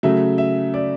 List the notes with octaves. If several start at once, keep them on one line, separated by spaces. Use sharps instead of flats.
C#3 F#3 A3 E5
E5
D5